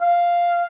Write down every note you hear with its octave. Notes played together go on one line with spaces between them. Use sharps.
F5